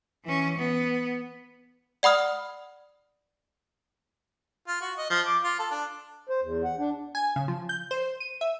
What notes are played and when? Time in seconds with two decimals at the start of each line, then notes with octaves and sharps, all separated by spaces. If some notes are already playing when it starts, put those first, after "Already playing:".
0.24 E3 C#4
0.58 B3
2.03 D5 F#5 B5 D#6 F6
4.67 F4
4.81 F#4
4.98 D#5
5.10 F3
5.27 D6
5.43 F4
5.59 A4
5.71 D4
6.29 C5
6.42 E2
6.64 F#5
6.79 D4
7.15 G#5
7.36 C#3
7.48 F3
7.69 G6
7.91 C5
8.20 D#7
8.41 E5